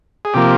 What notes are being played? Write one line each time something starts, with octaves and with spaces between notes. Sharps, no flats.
G#4
C3 F3 A#3 G4